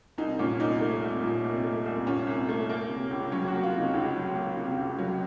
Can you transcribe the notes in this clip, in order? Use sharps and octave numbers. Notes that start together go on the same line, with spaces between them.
C2 D#4
A#2 C#4
C2 D#4
A3
C2
A#2
C2
A3
C2
A#2 C#4
C2
A3
A#3
C3
C#2
F#3 C#4
A#3 F#4
F4
C3
D#4
C#2 D#4
F#3
A#3
C3
C#2
F#3